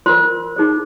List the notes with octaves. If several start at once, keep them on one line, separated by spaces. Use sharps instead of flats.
F4 A#4 C5 C6
D#4 G#4 C5